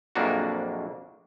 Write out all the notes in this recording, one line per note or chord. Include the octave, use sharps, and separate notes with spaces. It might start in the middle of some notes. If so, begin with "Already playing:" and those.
A#1 F2 F#3 A#3 D4 F#4